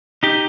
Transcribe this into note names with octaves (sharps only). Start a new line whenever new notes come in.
D#4 G4